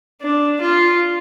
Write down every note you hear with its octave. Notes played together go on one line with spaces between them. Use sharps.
D4
F4